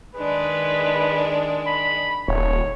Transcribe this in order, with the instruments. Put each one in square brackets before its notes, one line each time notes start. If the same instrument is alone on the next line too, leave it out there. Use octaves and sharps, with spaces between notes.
[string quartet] D#3 G#3 D4 [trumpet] B4
[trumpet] B5
[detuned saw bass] D#1 [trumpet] C#5